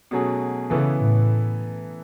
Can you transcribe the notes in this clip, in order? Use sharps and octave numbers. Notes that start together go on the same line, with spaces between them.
B2 F#3 A3 C#4 G#4
C#3 E3 B3 E4 A4
A2